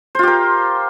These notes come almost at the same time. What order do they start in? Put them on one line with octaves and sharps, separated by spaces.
C5 F4 G4 A#4